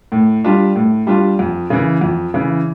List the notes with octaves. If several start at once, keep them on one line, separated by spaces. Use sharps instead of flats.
A2
G3 D4 F4
A2
G3 D4 F4
F2
C#3 E3
F2
C#3 E3